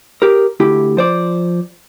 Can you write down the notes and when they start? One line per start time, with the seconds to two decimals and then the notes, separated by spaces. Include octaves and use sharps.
0.22 G4 A#4
0.60 D2 E4 G4
0.97 F3 C5 D5